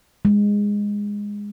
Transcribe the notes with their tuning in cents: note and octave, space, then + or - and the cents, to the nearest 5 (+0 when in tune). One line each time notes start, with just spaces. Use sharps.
G#3 -15